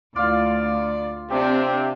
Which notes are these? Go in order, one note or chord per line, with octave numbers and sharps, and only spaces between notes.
D2 F4 D5 F5
C3 C4 D4 G4